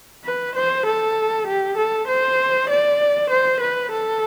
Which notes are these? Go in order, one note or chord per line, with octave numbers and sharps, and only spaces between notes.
B4
C5
A4
G4
A4
C5
D5
C5
B4
A4